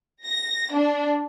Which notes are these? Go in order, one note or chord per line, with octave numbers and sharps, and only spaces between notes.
A#6
D4